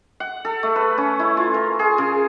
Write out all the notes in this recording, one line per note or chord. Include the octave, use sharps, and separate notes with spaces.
F#5
A4
A3
B4
C#4
E4
F4
A#4
G#4
C#3